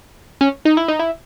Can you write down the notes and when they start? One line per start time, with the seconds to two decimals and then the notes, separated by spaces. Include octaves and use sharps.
0.41 C#4
0.65 D#4
0.77 E4
0.88 D#4
0.99 E4